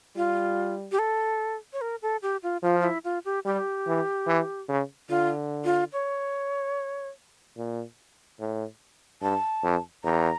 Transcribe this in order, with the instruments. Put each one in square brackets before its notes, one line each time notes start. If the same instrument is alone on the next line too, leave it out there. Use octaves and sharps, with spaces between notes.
[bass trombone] G3 [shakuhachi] F4
[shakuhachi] G4
A4
C#5
A#4
A4
G4
F4
[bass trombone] F3 [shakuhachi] F4
[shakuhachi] F4
E4
F4
G4
[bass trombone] G3 [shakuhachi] G4
[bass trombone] E3
E3
C#3
[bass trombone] D3 [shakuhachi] F4
[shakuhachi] F4
C#5
[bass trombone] A#2
A2
[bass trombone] G2 [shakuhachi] A5
[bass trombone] F2
[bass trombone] E2 [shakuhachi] A#5